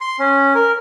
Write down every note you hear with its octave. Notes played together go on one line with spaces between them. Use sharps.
C6
C#4
A#4